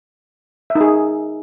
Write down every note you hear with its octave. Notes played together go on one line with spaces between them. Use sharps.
E5
D#4
G#4